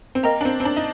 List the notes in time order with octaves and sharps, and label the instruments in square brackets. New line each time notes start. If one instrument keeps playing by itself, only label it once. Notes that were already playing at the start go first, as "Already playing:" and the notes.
[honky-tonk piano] C4
[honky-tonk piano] A#3 [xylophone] A#4 D#5 G5 A#5
[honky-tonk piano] D4
C4
C4
D4
D#4